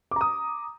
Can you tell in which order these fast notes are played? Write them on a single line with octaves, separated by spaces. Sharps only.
D6 A#5 D#6